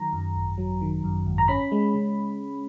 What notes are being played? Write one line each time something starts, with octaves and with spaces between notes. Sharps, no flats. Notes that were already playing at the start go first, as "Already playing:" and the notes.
Already playing: D#3 F#3 A#5
F#2
G#1
F#3
D#3
F#2
G#1
A#5
C#4 B5
G#3
C#3